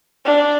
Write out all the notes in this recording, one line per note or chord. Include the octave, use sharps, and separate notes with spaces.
D4